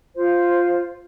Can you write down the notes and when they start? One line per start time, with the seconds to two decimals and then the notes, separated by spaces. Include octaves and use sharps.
0.15 F4 C5